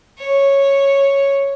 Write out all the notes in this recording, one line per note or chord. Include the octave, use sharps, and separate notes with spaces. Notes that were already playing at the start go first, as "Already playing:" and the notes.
C#5